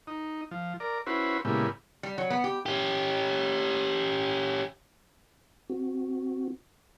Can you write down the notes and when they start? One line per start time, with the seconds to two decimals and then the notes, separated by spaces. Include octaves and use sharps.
0.07 D#4
0.51 F3
0.80 A#4 D5
1.06 C#4 E4 F#4 B4 C5
1.45 A#2 C#3 G#3 B3 E4 G4
2.03 G3
2.18 F#3
2.30 B3
2.44 G4
2.66 C#4 G4
5.70 C4 F#4